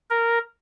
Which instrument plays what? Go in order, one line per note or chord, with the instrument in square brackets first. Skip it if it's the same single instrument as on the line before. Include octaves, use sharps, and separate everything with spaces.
[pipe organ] A#4